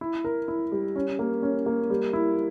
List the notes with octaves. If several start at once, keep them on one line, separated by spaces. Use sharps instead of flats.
E4
A#4
E4
G3
C#4
A#3
C#4
A#3
G3
E4